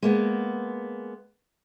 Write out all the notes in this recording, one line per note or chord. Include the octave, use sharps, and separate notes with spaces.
G#3 A#3 B3